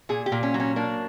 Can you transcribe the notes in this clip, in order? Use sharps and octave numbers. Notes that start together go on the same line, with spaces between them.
A#2 G#4
G4
A#2
C#4
F#3
C#4
A#3 D4